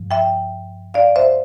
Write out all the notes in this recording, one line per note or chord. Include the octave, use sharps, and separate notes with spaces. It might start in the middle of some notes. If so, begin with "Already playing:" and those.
Already playing: G2 F3
E5 G5
D5 F5
C5 E5